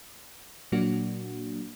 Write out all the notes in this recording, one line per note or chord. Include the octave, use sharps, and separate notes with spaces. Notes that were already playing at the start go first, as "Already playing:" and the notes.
A#2 F#3 A#3 D4 F#4